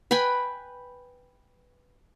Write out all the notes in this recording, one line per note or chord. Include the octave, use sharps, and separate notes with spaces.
B4 G5 G#5 B5